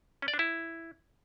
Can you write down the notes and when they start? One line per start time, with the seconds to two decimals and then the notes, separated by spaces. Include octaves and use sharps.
0.22 C#4
0.28 D5
0.34 D4
0.39 E4